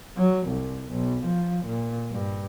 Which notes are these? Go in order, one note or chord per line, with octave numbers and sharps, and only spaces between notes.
F#3
C2
B1
F3
A#2
G2